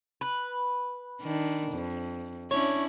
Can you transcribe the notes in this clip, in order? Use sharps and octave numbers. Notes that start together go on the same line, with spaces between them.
B4
D#3 D4
F2
C#4 D4 E4 C#5